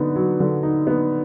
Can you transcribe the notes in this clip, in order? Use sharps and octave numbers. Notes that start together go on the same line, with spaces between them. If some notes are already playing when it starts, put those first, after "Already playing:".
Already playing: D3 B3 D#4
F#3
D3
D#4
B3